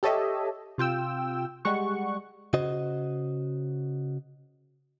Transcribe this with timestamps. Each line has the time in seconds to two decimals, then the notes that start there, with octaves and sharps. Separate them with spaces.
0.03 G4 A4 C#5 D#5 E5
0.78 C3 F4 G5 E6
1.65 G3 G#3 F#5 C#6
2.54 C#3 F#4 C5 D#5